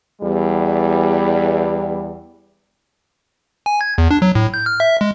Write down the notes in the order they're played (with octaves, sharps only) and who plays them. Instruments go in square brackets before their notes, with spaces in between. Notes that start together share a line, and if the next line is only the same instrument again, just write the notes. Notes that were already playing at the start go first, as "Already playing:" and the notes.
[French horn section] E2 G3
[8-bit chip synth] G#5
G#6
E2
D4
F#3
A2
G6
F6
E5
G#3